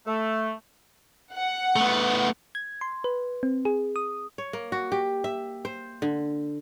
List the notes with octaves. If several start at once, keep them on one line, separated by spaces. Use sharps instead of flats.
A3
F#5
A3 B3
G#6
C6
B4
C4
G#4
D#6
C#5
A#3
F#4
G4
E5
C5
D3